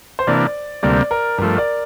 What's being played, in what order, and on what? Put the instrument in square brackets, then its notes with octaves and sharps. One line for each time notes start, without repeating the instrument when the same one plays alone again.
[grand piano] C5
[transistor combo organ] C3 E3 A#3 D4 [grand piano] D5
[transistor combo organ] D2 C3 G3 A#3 [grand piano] D5
[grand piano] A#4
[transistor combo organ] G2 F3 A3 [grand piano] A#4
[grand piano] D5